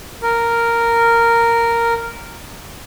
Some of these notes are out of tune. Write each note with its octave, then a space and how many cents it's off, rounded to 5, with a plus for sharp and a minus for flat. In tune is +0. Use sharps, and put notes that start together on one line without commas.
A#4 -5